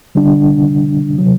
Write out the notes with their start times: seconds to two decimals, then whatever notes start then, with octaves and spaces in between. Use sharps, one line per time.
0.15 D3 G3 D4
1.18 C3 F#3